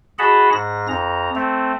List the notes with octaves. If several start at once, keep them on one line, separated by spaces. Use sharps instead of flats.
F#4 G#4 D#5 F#5 A5 B5
G#2 A#6
F2 A#5
A3 C4